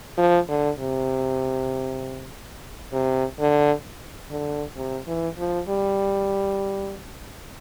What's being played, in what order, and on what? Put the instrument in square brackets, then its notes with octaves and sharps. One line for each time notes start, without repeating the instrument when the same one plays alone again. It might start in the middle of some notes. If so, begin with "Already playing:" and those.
[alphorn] F3
D3
C3
C3
D3
D3
C3
E3
F3
G3